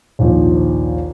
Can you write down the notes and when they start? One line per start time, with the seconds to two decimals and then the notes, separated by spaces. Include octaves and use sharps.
0.19 A#1 D#2 D#3 F3